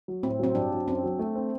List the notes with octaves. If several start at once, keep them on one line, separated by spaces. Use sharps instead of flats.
F#3
A2 C4
F#3 C4
G2 D4
F#3
F#2 C4
F#3
A3
C4